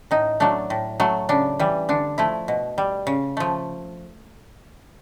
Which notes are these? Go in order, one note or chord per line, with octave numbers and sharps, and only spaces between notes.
A2 D#4
F#3 A3 D4
A2
F#3 A3
C#3 D4
E3 G3
D3 D4
F3 A3 E4
B2
G3
C#3
F3 A3